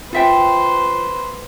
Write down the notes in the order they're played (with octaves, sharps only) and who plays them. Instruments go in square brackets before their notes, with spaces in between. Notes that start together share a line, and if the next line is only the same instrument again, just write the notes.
[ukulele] F4 E5 G5 [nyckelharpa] B4 C5